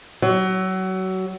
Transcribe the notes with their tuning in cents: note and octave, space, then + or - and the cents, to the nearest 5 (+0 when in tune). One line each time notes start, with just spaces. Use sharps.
F#3 +25